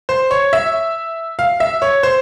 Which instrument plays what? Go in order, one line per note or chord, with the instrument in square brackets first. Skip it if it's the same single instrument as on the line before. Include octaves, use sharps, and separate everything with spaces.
[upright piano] C5
C#5
E5
F5
E5
C#5
C5